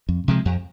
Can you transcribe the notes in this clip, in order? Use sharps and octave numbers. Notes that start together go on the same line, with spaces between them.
F2
C3 F3 G#3
F2